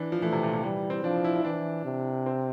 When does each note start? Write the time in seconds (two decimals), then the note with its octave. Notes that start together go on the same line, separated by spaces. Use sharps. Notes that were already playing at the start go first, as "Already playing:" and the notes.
Already playing: E3 D4
0.12 F3
0.22 E3 A3
0.32 C3
0.43 A#2
0.53 C3
0.63 E3 G3
0.90 C4
1.04 F3 D4
1.24 E4
1.36 E4
1.44 E3 D4
1.85 C3
2.26 C4